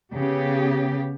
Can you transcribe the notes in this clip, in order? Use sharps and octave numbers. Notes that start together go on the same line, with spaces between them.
C#3 B3 G4